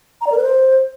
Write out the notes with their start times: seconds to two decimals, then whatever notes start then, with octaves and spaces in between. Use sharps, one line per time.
0.21 A#5
0.26 D5
0.32 A#4
0.37 B4
0.43 C5